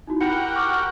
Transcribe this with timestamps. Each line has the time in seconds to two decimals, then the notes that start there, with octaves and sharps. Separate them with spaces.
0.07 D#4 E4 F#4
0.21 F#4 G4 A#4 F#5 B5 C#7
0.56 C#6 D6 F6